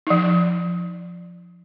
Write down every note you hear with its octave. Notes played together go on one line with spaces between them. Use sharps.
F3 D#4